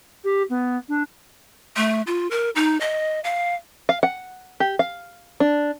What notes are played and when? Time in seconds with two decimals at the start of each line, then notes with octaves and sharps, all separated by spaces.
0.24 G4
0.49 B3
0.88 D4
1.76 A3
2.07 F4
2.31 A#4
2.56 D#4
2.80 D#5
3.24 F5
3.89 F5
4.03 F#5
4.60 G4
4.79 F5
5.40 D4